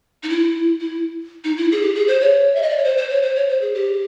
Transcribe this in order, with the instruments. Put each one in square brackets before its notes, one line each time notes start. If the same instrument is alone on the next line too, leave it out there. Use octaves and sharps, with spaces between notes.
[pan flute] D#4
E4
E4
D#4
E4
G#4
G4
G#4
C5
C#5
E5
D#5
D5
C#5
C5
C5
C#5
C5
C#5
C5
G#4
G4